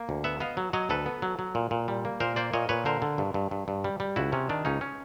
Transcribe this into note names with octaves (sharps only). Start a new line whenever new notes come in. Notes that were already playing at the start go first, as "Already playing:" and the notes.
Already playing: A#3
D2
B3 E5 F#5
B3 D#5 F5
F#3
F#3 C#5 D#5
D2 A4 B4
B3
F#3
F#3
A#2
A#2
G3
A#3
A#2 A#4 C5
A#3 C5 D5
A#2 C#5 D#5
A#2 B4 C#5
D3 A#4 C5
D3
G2
G2
G2
G2
G3
G3
C#2 E4 F#4
C3 C#4
D#3 D4
C#2 C#4 D#4
C#4